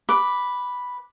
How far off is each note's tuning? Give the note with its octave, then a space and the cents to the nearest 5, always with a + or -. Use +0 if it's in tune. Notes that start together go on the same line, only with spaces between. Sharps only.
B4 +0 D6 +0